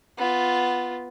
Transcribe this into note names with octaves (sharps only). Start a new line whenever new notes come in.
B3 F4